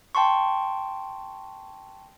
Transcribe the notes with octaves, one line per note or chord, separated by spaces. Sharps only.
G5 A5 C6 C#6